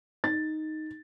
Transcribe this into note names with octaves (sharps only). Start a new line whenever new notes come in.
D#4 A6